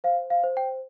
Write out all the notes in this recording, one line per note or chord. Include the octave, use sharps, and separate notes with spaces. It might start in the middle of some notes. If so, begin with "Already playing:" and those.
C5 F5
F5
C5
G5